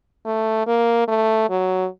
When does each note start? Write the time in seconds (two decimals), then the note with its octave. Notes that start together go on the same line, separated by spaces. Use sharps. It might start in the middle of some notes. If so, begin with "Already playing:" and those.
0.25 A3
0.66 A#3
1.08 A3
1.49 F#3